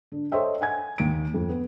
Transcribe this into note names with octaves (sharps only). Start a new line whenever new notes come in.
D3
A4 C5 C#5 D#5 E5 G5
F#5 G#5 G#6
D#2 D7
F2
B3